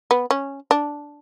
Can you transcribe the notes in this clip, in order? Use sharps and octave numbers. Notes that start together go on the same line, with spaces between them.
B3
C#4
D4